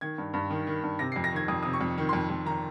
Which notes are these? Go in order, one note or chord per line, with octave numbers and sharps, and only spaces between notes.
D#3 G#6
G2
G2
D#3
D#3
G2
C3 A#6
C7
F2
A#6
D#3 G#6
F2 D#6
C3 D#6
C#6
F2
D#3
C6
F2
F2
D#3 A#5